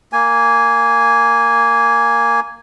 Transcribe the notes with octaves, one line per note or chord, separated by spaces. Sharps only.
A#3 G#5